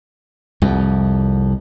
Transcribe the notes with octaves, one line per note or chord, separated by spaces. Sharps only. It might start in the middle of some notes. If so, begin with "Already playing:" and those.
C2 F2